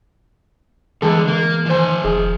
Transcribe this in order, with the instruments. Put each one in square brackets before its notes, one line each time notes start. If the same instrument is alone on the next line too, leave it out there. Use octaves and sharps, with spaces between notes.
[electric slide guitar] D3 G3 [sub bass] E3 [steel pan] G#3 G#4 A4
[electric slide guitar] A#3
[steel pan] D#3 C5 [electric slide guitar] F3 G#5
[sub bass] F1 [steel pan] D#4 G#4